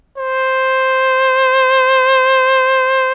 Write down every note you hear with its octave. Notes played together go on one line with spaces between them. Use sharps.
C5